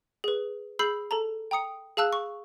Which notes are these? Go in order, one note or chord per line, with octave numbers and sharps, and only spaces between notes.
G#4 B4
G#4 B5 E6 G6 C7 F#7
A4 A5 A#5
G5 A#5 D#6 C#7
G#4 F5 A5 E6 F#6
C#6